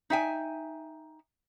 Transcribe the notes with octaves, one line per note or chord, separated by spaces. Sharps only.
D#4 E5 G5 G#5